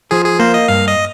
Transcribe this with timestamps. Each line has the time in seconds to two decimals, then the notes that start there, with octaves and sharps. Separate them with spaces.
0.11 F3 G#4
0.25 G#4
0.39 A#3 C5
0.54 D#5
0.68 G2 F5
0.88 D#5